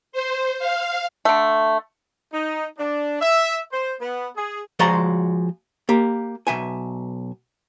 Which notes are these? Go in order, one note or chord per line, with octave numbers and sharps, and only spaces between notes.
C5
F5
D3 A3
D#4
D4
E5
C5
B3
G#4
F3 G#3 F#4 D5 A#5 C6
A#3 G4
B1 E5 G#5